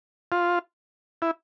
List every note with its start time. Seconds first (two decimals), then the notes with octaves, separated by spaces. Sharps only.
0.32 F4
1.22 E4